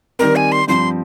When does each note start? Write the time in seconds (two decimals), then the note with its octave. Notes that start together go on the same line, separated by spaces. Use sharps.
0.19 D#3 G3 C4 A#4
0.36 G#5
0.52 C6
0.67 G2 F3 C4 C6